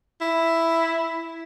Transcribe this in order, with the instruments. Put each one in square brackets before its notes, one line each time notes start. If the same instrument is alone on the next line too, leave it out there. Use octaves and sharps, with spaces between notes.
[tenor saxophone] E4